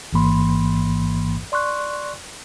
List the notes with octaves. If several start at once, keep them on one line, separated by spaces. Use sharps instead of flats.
A1 G#2 E3 A#3 B5 C6
D5 C6 C#6 F#6